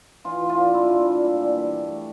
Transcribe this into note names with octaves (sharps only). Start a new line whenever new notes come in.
E3 F4
E3
F4
D4
A#2 E4
A#2
A#2
G3
E3
G3
D4
A3